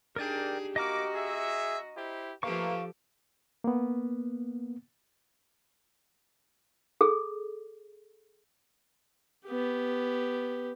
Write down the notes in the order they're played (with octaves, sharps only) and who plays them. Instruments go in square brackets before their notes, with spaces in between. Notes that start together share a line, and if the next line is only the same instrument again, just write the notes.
[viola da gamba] D4 D#4 G#4 [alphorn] G4 [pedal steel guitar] A#4 D5 G5
[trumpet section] A#3 D6 [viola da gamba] F#4 [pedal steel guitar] D#5 A#5 F6
[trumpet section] G#4 E5
E4 G4 C5
[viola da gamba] F3 G4 A4 [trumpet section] A3 A#3 [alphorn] B4 [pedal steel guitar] F5 C#6
[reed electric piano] A#3 B3
[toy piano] G#4 A4
[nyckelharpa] B3 G4